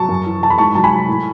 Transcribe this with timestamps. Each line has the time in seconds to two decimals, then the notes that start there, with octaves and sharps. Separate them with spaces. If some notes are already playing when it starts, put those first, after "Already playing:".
Already playing: F#3 A5 C#6
0.09 F#2
0.26 E3
0.42 E3 A5
0.50 B5
0.58 G#2 A5 C#6
0.75 F#3 A5
0.84 G#5 B5
0.92 F#3
1.08 A2